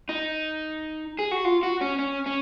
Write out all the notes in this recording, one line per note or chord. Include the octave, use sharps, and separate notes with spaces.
D#4
G#4
F#4
F4
F#4
C#4
C#4
C#4